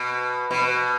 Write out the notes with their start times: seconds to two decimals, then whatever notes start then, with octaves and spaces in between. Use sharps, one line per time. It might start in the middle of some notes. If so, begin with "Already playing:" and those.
Already playing: B2
0.51 B2